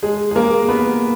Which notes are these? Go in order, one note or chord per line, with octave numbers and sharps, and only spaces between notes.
G#3 G#4
G#4
A#3 A#4
B3 B4